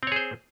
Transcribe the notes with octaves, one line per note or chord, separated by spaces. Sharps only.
C4 G#4 C5 C#5